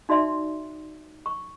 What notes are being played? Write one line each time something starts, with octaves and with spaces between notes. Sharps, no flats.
D#4 F#4 D5 E5 C6
C#6